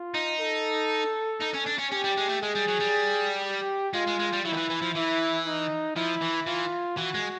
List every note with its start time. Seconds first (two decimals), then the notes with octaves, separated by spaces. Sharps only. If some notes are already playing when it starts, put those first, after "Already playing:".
Already playing: F4
0.15 D#4
0.40 A4
1.40 D#4
1.53 C#4
1.66 D4
1.78 C#4
1.91 C#4 G4
2.04 G3
2.17 G#3
2.29 A3
2.42 G#3 G#4
2.55 G3
2.68 F#3
2.80 G3
3.43 G4
3.93 G#3 F4
4.07 G#3
4.19 G#3
4.32 G3
4.45 F#3 E4
4.53 D#3
4.57 E3
4.70 E3
4.82 F3
4.95 E3 E4
5.46 D#4
5.96 F3 E4
6.22 E3
6.47 E3 F4
6.97 E3 F#4
7.14 G#3